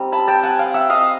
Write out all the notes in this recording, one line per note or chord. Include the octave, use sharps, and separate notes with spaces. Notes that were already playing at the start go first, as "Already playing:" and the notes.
Already playing: G3 C4 D#4
A5 B5
G5 A5
F#5 G#5
F5 G5
E5 F#5
D#5 F5